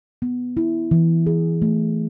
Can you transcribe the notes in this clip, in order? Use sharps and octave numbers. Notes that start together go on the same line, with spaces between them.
B3
E4
E3
G#4
A3